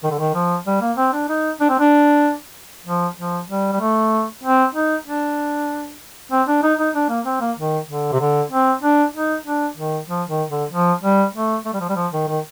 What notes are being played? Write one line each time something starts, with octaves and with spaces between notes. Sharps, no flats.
D#3
D3
D#3
F3
G3
A#3
C4
D4
D#4
D4
C4
D4
F3
F3
G3
G3
A3
C4
D#4
D4
C4
D4
D#4
D#4
D4
A#3
C4
A#3
D#3
D3
C3
D3
C4
D4
D#4
D4
D#3
F3
D#3
D3
F3
G3
A3
A3
G3
F3
G3
F3
D#3
D#3